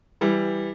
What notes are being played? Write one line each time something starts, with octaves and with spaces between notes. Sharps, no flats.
E3 G3